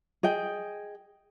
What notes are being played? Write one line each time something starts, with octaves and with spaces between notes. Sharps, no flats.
G#4 D#5 G5